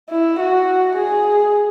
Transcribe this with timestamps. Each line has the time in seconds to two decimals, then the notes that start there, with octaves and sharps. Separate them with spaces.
0.11 E4
0.39 F#4
0.96 G#4